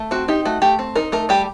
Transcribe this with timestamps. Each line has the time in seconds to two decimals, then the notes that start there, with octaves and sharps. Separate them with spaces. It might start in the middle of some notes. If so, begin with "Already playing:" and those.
Already playing: A3
0.11 C4 F#4
0.28 D#4 G4
0.45 A3 F#4
0.62 A3 G4
0.79 C4
0.95 D#4 A#4
1.12 A3 A#4
1.29 G3 G4